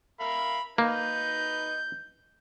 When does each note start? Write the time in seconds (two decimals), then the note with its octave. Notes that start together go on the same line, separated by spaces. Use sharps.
0.20 A#4 E5 F5 B5
0.78 A#3 D#4 B4 A#5 G6